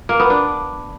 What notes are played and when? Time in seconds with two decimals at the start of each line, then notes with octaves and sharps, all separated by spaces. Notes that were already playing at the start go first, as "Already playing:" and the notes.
0.09 A#3
0.20 B3
0.30 D4